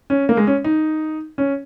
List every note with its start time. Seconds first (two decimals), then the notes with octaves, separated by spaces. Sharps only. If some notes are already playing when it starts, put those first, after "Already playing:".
0.10 C#4
0.29 A#3
0.37 G#3
0.47 C#4
0.64 D#4
1.38 C#4